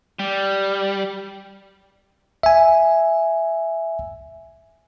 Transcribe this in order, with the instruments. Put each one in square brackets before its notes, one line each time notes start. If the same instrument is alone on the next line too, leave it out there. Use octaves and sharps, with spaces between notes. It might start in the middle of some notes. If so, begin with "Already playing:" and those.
[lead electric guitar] G3
[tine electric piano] E5 G#5